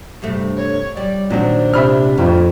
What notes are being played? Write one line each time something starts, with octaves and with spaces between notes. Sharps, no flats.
G2 C3 A3
C#5
G3 D5
A#2 D#3 F#3 C4 D4
C3 E5 B5 F6
F2 A2